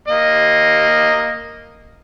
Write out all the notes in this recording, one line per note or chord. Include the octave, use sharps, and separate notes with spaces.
A#3 D#5